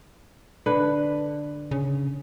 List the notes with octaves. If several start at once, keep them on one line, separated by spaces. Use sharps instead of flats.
D3 B4
C#3